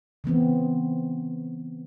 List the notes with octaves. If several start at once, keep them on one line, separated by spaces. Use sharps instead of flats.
C#3 E3 B3 C4